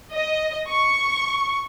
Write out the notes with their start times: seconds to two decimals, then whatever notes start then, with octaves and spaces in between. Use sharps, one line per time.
0.13 D#5
0.68 C#6